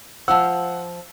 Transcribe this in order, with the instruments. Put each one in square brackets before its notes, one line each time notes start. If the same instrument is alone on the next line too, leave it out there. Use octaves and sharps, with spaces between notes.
[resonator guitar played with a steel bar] F3 F4 C5 [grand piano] F#5 [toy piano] E6